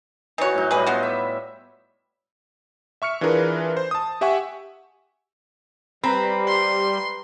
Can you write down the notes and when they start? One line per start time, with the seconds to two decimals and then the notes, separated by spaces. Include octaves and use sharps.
0.38 E3 D#4 F#4 C#5
0.54 A2 F#3 D#4
0.71 A2 G3 G#4 B4 D#5
0.86 B3 F4 F#4
1.03 E5
3.02 E5 C#6 F6 C#7
3.21 E3 D4 F4 G#4 A#4 B4
3.77 C5
3.91 A5 D#6
4.21 G4 E5 F#5 G#5 C#6
6.04 G3 C4 B4 A#5 B5
6.47 C6